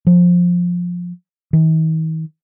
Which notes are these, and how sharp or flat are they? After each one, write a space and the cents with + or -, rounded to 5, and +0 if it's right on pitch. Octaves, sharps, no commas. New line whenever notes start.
F3 +15
D#3 +45